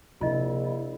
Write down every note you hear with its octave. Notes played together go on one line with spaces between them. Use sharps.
A#1 C3 E4 F4 D#5